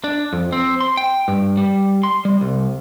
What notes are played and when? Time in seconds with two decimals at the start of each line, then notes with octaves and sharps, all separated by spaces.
0.04 D4
0.33 F2
0.53 C4
0.81 C6
0.97 G5
1.28 G2
1.57 G3
2.03 C6
2.25 G3
2.41 C2